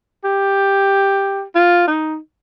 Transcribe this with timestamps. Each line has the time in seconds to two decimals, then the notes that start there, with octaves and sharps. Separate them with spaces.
0.24 G4
1.55 F4
1.87 D#4